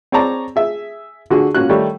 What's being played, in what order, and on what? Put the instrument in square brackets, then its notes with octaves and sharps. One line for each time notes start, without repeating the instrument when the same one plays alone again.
[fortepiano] C4 G#4 C#5 D5 A5 A#5
G#4 E5
D3 F#4 G#4
A#2 C#4 F#4 F#6
D#3 G3 A3 C#5